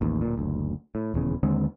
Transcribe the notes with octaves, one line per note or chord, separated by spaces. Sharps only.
A1 D#2
D1 A#2
F#1 D2
A2
D#1 E2 C#3
D#2 D3 G#3 C4